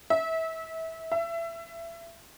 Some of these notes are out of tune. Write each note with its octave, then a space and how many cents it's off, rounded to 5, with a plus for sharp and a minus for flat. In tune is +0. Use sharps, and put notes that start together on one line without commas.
E5 -25
E5 +25